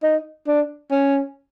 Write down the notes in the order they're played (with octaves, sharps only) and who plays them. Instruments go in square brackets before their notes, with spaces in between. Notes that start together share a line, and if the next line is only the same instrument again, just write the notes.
[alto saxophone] D#4
D4
C#4